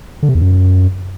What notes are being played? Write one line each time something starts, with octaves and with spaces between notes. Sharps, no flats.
D3
C3
E2
F#2